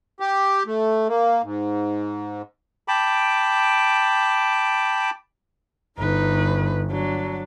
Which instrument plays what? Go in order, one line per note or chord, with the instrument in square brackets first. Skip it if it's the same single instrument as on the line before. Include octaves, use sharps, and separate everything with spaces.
[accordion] G4
A3
A#3
G#2
[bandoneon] G5 A5 B5 D6
[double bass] G1 [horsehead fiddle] D#4 B4
[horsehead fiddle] F#3 D4